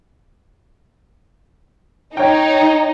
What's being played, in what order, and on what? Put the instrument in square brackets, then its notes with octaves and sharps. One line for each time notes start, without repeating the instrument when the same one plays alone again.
[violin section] D#4 [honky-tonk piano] C#5 G5